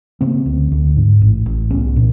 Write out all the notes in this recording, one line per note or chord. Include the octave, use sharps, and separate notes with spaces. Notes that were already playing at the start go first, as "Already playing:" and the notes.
C#3 A#3 C4
D2
D2
G#2
A1
A1
C2 B3 C#4
A#2